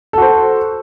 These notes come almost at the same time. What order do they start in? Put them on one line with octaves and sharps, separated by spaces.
A4 F#4 C5